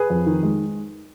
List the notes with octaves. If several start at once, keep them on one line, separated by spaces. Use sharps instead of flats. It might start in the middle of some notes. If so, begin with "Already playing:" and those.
Already playing: G#4 B4
F2
D#3
G#3